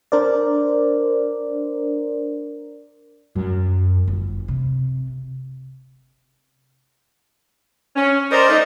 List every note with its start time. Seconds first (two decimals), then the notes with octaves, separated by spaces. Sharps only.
0.12 D4 A#4 C5 D5
3.36 F#2
4.08 G1
4.48 C3
7.96 C#4
8.31 A#4 C5 D5 D#5
8.48 A3 D#4